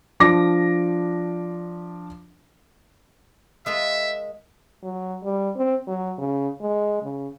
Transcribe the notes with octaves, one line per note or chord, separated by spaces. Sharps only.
F3 D4 D6 A#6
G#3 F4 A#4 E5
F#3
G3
C4
F#3
C#3
G#3
C#3